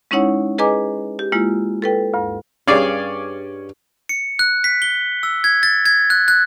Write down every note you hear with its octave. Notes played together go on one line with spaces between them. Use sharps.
G#3 C#4 D#4 E4 C#5 F#5
G#4 B4 D#5 G#5 A#5 D6
G4
G#3 A#3 E4 F4
A4 B4 G5
D2 G2
G2 C#4 G#4 D5 F5
C#7
F#6
B6
G7
E6
G#6
A6
G#6
F#6
F#6